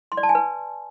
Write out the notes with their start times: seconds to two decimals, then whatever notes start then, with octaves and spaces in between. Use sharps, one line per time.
0.12 C6
0.17 D5
0.23 A5
0.29 G#5
0.35 B4